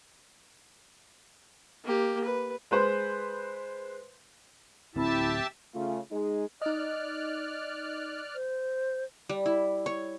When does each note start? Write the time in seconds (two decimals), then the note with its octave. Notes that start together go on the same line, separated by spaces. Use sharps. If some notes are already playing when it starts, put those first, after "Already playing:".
1.84 A#3 G4
2.25 B4
2.71 G#3 B4 C5
4.95 D1 C4 E4 G4 E5 A5
5.75 C#3 A3 F4
6.11 G#3 D#4 G#4
6.61 D#4 D5 D#5 F6 F#6
8.35 C5
9.29 G3
9.46 E4
9.86 C#5